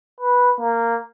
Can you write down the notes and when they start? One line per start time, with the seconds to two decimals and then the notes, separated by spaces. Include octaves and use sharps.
0.21 B4
0.60 A#3